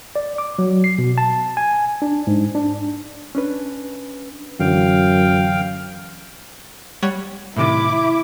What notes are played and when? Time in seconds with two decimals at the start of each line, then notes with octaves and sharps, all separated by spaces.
0.16 D5
0.38 D6
0.59 F#3
0.84 C7
0.98 B2
1.18 A5
1.57 G#5
2.02 D4
2.27 G#2
2.55 D4
3.35 C#4 D4 B4
4.60 F#2 D3 E3 F5 G5
7.03 G3 C#5 F#5
7.56 A2 C3 D#3 E4 D6